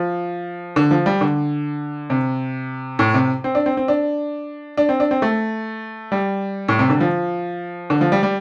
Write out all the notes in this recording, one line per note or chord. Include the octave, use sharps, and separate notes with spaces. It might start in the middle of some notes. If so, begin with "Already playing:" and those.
Already playing: F3
D3
F3
G3
D3
C3
A2
C3
C4
D4
C4
C4
D4
D4
C4
D4
C4
A3
G3
A2
C3
D3
F3
D3
F3
G3
G3